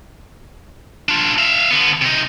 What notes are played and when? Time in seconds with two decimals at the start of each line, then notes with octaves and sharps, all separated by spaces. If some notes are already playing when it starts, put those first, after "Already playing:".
1.09 D4 F4
1.38 E5 F5
1.71 D3 B3
2.02 C3 D#4